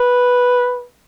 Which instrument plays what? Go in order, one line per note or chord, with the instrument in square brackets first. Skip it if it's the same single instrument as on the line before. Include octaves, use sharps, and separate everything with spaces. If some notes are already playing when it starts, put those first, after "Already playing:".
Already playing: [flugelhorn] B4